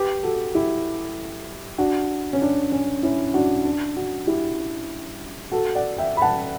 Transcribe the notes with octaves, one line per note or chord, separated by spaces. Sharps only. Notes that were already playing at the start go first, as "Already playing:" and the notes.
Already playing: G4 B4
F#4 A4
E4 G4
D4 F#4
C#4
D4
C#4
C#4 E4
D4 F#4
D4
D4 F#4
E4 G4
F#4 A4
D5 F#5
E5 G5
B5
F#5 A5